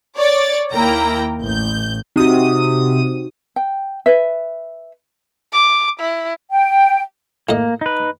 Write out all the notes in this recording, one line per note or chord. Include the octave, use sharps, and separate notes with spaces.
C#5 D5 A6
D#2 A#3 E4 G5 A#5
A1 G6
C3 D#4 F#4 D#6
G5
B4 E5
D6
E4
G5
A2 A#3 D#5
D#4 B4